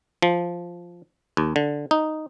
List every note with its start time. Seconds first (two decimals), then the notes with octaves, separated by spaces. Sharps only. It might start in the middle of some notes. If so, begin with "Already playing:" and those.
0.22 F3
1.37 D#2
1.56 D3
1.91 D#4